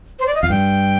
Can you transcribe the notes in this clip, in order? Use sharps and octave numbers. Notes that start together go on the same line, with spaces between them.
C5
D5
D#5
F2 F5
G2 G5